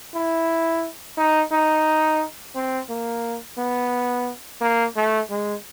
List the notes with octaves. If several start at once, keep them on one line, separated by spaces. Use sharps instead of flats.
E4
D#4
D#4
C4
A#3
B3
A#3
A3
G#3